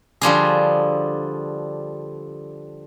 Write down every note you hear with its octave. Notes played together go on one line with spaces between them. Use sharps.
D3 F3 G3 G#4